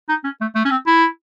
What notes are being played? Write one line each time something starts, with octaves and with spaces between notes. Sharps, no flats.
D#4
C#4
A3
A3
C#4
C4
E4